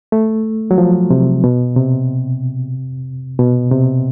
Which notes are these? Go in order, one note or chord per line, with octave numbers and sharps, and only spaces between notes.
A3
F#3
F3
C3
B2
C3
B2
C3